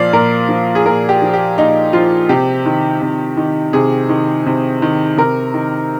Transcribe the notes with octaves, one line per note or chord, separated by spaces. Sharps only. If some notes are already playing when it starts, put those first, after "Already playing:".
Already playing: A#2 F3 D5 F5
A#2 A#4
F3
G#4
A#2 A#4
G4
F3
G4
A#2 D#4
F3 F4
C3 G4
D#3
C3
D#3
C3 G#4
D#3
C3
D#3
C3 A#4
D#3